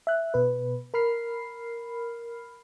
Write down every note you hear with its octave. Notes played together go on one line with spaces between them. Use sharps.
E5 F#6
B2 B4
A#4 B5 F6 C7